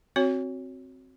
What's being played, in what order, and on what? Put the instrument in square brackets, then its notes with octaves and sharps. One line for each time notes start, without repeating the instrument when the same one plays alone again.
[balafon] C4 F#4 C#5